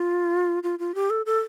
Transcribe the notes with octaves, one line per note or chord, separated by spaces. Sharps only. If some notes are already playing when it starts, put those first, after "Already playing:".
Already playing: F4
F4
F4
G4
A4
A4